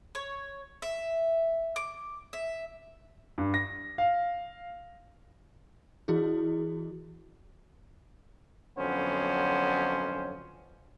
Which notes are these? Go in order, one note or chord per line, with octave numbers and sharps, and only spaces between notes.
C#5
E5
D6
E5
G2
A#6
F5
E3 E4 F#4 G#4
F2 D3 F#3 B3 C#4 C5